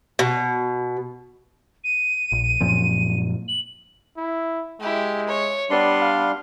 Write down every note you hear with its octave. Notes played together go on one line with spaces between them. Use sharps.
B2
D#7
A#1
F#2 A#2 F3
F#7
E4
G#3 E4 G4
C#5
G3 B3 D4 D5 C6
F5